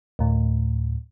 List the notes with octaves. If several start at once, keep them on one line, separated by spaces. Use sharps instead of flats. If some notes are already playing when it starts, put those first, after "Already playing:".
D2 A2